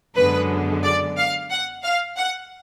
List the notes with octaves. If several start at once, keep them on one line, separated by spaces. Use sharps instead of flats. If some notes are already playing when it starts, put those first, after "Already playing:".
F#2 D3 G#3 B3 B4
D5
F5
F#5
F5
F#5